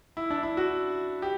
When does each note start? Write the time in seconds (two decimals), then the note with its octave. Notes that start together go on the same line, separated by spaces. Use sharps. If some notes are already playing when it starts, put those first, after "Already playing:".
0.17 E4
0.31 D4
0.43 E4
0.57 F#4
1.22 G4